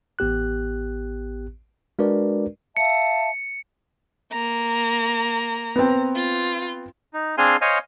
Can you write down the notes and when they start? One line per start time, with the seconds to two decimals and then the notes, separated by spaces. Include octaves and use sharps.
0.19 A1 B3 G4 F#6
1.99 G#3 D4 F#4 A#4 B4 D5
2.77 E5 F5 A5 C#7
4.32 A#3 A#5
5.76 B3 C4
6.15 F4
7.14 D#4
7.38 C4 D4 G#4 F5 G#5 C6
7.61 C5 C#5 D#5 F5 G#5